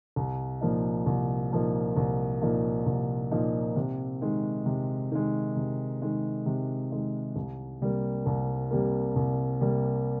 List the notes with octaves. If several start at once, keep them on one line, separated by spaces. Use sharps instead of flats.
C2
A#2 F3 A#3 D#4
C2
A#2 F3 A#3 D#4
C2
A#2 F3 A#3 D#4
C2
A#2 F3 A#3 D#4
C3
D#3 G#3
C3
D#3 G#3
C3
D#3 G#3
C3
D#3 G#3
C2
C3 G3 A#3
C2
C3 G3 A#3
C2
C3 G3 A#3